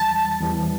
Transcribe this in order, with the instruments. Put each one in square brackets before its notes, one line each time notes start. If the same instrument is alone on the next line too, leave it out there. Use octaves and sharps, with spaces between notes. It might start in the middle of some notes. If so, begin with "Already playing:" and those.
Already playing: [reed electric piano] E2 E3 G3 [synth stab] A5
[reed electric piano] E2 E3 G3